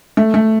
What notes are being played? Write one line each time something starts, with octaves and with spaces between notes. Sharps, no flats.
A3
A3